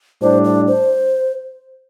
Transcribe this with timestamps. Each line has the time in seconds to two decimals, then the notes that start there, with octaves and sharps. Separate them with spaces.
0.21 A2 G3 D4 C5
0.45 D5
0.67 C5